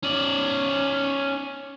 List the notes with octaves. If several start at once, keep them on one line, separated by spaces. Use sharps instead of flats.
C#4 D5